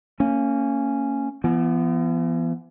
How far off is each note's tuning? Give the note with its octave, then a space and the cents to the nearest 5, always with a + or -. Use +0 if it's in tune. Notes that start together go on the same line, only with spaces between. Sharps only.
A#3 -30 C#4 +0
E3 +45 B3 +0